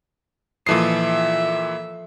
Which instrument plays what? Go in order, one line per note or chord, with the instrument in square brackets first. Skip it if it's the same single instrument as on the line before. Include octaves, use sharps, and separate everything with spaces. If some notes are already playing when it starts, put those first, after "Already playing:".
[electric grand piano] A#2 E3 C7 [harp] F3 A4 D#5 [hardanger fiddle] E5